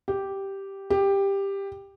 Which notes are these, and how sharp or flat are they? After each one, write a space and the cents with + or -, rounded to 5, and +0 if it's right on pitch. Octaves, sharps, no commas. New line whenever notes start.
G4 -5
G4 +10